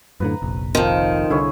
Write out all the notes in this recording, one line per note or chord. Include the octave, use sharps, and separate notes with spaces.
F#2 A2 D3 B4 A#5
F1 A#1
F2 D#3 C5 F5
C2 D3 E4 G#4 C#5